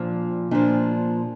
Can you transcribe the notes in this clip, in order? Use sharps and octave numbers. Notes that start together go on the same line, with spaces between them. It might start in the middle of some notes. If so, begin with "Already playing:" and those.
Already playing: A#2 F3 D4
A#2 F3 D4